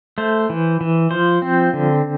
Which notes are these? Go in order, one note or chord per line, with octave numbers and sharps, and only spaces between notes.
A3 C5
E3
E3
F3 C5
C4
D3